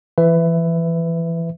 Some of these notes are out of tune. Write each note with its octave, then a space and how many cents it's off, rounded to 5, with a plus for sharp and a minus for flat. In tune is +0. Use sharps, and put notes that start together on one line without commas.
E3 +20 B4 +20 E5 +0